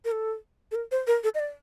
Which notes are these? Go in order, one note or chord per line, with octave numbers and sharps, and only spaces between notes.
A#4
A4
A4
A#4
C5
A#4
A4
D#5
D5